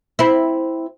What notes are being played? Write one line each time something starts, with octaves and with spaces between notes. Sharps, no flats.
C4 E4